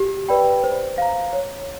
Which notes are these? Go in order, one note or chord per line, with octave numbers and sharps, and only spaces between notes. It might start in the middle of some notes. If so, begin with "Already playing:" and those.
Already playing: G4
B4 D5 G5 B5
C5
F5 A#5
C#5